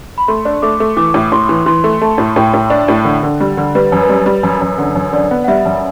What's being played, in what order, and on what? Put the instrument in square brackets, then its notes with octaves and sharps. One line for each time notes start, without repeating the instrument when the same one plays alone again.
[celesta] B5
[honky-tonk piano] A3 [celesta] C6
[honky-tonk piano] D4
[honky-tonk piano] A3 [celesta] D6
[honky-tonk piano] A3
[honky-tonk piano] E3 [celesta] D6
[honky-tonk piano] A2
[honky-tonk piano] A2 [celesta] C6
[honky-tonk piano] E3
[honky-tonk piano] E3 [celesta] C6
[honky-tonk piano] A3
[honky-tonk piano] A3 [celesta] A5
[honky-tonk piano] A2
[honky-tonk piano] A2 [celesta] G5
[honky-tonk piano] A2
D4
A2
D3
D3
G3
D3
[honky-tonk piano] G3 [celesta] B4
[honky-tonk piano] F#2
[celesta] B4
[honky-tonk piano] G3
G3
F#2
F#2
D3
F#2
[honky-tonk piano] D3 [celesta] D5
[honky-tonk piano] B3
[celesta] F#5
[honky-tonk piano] G3 [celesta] E5
[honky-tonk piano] F#2